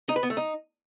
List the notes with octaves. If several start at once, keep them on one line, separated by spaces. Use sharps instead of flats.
D#4
B4
B3
A3
D#4